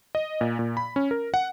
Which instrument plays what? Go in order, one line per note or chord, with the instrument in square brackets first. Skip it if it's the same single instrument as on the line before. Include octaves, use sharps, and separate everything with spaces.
[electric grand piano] D#5
A#2
A#2
B5
C#4
A#4
F#5